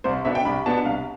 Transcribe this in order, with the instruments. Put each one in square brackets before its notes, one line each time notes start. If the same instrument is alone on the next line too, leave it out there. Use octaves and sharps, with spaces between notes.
[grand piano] C2 [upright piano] C5
[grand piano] B2 B3 D4 [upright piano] E5
[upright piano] G5
[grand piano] C2 [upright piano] B5
[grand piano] B2 B3 D4 [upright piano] A5
[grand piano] C2 [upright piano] F5